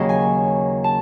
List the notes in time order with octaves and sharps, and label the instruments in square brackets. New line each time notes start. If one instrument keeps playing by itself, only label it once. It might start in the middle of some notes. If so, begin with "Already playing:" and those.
Already playing: [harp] D#2 C#3 F#3 D#5
G#5
A5